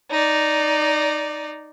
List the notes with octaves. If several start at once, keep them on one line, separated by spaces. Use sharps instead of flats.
D#4 D5